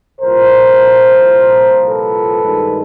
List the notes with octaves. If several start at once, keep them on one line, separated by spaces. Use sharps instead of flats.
C2 A#2 F3 A#4 C5
A4 B4
G2 D#3 G#3